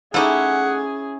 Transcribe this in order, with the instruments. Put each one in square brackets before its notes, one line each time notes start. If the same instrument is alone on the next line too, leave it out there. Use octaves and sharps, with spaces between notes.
[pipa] A3 D#4 G4 [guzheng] C#4 E4 [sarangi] G#4 [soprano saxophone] F#5